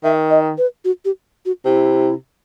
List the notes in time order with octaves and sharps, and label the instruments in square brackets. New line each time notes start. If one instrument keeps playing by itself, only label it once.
[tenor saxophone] D#3 [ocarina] E5
[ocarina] D#5
B4
F#4
G4
F#4
[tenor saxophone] C3 [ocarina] E4